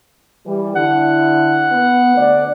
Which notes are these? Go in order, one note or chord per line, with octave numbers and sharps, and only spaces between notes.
E3 G3
D3 E4 F#5
B3
D2 D5